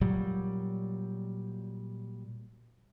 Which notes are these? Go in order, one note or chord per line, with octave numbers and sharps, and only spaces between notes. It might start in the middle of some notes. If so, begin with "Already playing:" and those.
A#2 F#3 G3